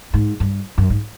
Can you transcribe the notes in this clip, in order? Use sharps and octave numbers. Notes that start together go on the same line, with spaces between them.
G#2
G2
F#2
G#2